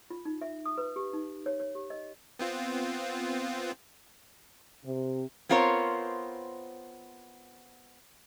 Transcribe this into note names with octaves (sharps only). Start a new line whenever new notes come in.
F4
D#4
E5
D#6
B4
G4
D#4
C#5
C#5
G4
D#5
B3 C4 F4
C3
B3 C4 F4 A#4 C5 C#5